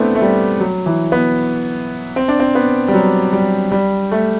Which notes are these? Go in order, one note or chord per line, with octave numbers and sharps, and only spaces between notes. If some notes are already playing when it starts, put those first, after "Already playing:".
Already playing: A3 B3 C4 D4 E4
A3
G3
F#3
E3
B3
C4
D4
C4
B3
G3
F#3
G3
G3
A3